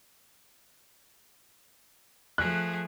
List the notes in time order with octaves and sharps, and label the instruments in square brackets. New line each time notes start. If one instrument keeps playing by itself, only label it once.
[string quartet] F3 A3 G#4 [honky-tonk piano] F#6